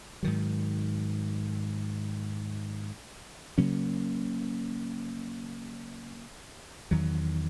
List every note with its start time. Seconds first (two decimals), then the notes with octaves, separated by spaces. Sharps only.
0.23 G#2 D#3 F#3
3.58 C#3 F#3 A#3 C#4
6.91 E2 D#3 F#3